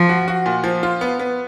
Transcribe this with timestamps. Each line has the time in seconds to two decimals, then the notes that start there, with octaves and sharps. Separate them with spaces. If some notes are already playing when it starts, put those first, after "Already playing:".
Already playing: F3
0.09 F#4
0.28 F#4
0.46 A#2
0.64 F3
0.83 F4
1.01 B3
1.19 B3